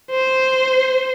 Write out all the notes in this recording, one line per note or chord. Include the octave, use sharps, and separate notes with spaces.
C5